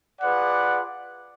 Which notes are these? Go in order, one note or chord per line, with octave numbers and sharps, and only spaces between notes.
F4 G#4 B4 D5 F#5